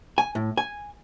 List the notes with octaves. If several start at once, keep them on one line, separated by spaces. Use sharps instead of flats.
G#5
A2
G#5